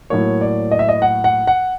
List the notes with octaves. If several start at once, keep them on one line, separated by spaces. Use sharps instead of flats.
A2 F#3 A#3 C#5
D5
D#5
E5
D#5
F#5
F#5
F#5